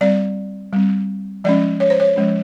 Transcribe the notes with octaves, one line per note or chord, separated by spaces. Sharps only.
G3 C4 D5
G3 C4
F3 G#3 C#4 D5
C#5
C5
C#5
F3 G#3 C#4